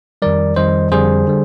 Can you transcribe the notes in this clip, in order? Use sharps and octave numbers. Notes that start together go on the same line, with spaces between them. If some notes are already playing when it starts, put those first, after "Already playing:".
F2 D#3 G3 A#4 D5
F2 D#3 G3 C5 D#5
F2 D3 G3 G#4 C5
D3 G3